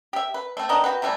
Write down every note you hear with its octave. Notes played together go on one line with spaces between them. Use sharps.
G4 E5
B4
A3 C4
D#3 B3 D4 D#4
F#4 G4 B4
C3 E3 G3 A3